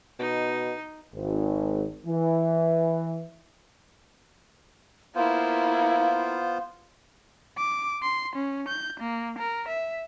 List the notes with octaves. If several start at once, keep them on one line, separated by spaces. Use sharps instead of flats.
B2 D#4
G#1
E3
A#3 B3 E4 F4 C5 F5
D6
C6
C#4
G6
A#3
A#4
E5